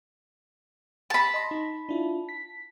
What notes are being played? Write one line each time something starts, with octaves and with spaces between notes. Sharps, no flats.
A5 B5
D#5 C6 A#6
D#4
D4 E4 F4
B6